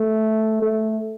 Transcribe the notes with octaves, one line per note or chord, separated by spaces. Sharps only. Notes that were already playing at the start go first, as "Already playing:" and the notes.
Already playing: A3
A3